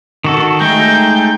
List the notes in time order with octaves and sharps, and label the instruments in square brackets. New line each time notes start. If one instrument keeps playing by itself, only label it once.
[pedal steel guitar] D#3 F#4 A4
[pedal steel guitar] G#3 A3 D#4 [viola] G5